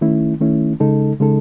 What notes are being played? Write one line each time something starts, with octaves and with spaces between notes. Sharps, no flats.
D#3 A3 C#4 E4
D#3 A3 C#4 E4
C#3 G#3 D#4 A4
C#3 G#3 D#4 A4